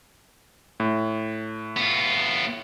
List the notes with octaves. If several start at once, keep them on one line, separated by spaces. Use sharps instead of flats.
A2
B3 F4